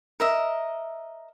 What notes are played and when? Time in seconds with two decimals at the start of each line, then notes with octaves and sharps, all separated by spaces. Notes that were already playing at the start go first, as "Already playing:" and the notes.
0.20 A#4 D#5 E5